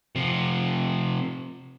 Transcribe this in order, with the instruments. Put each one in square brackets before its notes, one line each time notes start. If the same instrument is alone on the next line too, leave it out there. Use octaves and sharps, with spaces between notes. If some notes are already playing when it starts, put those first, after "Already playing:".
[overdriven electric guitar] C3 F3